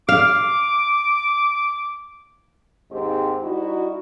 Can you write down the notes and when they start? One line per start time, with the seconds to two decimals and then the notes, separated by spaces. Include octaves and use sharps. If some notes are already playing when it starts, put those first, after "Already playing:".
0.09 F5 D6
2.91 D#2 G#2 G#3 C4 G4
3.42 G3 D#4 E4 F#4